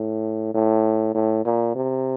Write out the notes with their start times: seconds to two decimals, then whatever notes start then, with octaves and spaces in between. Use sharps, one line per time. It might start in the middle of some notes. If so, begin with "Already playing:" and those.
Already playing: A2
0.54 A2
1.15 A2
1.46 A#2
1.75 C3